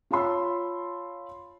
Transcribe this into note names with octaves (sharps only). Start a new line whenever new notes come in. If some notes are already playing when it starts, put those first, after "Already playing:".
F4 C#5 A5 B5 C6 E6